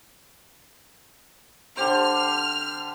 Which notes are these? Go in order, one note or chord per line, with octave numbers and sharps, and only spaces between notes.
D3 G4 C5 F6